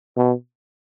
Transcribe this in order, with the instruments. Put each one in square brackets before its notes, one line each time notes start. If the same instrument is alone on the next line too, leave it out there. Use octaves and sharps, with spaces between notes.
[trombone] B2